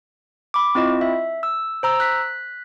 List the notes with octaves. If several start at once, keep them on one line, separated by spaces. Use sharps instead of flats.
B5 D6
C4 E4 F4 D#5
E5
E6
C5 A#5 E6
F#6 B6